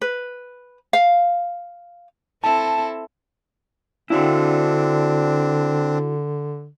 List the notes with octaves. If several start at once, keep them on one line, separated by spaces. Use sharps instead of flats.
B4
F5
C4 E4 A4 A5
D3 C4 D4 E4 F#4